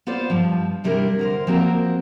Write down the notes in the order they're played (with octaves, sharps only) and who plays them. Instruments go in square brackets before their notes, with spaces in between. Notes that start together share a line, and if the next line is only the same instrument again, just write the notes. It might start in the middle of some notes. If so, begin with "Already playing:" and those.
[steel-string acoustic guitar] B3 F4 C5 D5
G2 F3
C3 G3 D4 E4 A#4
D2 A#4 C5
F3 A#3 C4 F#4 A#4